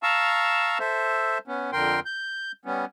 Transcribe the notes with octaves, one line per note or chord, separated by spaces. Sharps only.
F5 A5 A#5 C#6 E6
A4 C5 E5
B3 C#4
F2 D3 A#4 G5 C6
G6
G3 B3 C#4